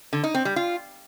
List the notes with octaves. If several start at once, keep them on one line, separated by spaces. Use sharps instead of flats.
D3
D#4
C4
G3
F4